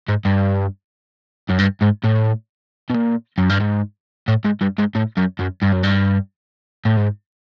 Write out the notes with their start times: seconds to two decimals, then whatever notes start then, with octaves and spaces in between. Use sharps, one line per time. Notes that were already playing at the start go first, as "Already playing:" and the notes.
0.09 G#2
0.25 G2
1.50 F#2
1.60 G2
1.82 G#2
2.04 A2
2.90 B2
2.94 A#2
3.38 F#2
3.50 G2
3.60 G#2
4.28 A2
4.45 G#2
4.61 G2
4.79 G#2
4.95 A2
5.17 F#2
5.40 F#2
5.63 G2
5.73 F#2
5.83 G2
6.85 A2
6.97 G#2